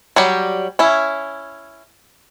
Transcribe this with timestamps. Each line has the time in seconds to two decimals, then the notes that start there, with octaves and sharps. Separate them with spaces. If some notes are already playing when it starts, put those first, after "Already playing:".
0.16 F#3 G3 G4
0.79 C#4 E4